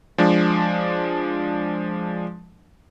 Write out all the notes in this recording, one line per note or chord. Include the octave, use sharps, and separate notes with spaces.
F3 G#3 D4